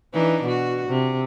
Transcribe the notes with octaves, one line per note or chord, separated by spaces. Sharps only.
E3 D4 D#4
B2 F#4
C3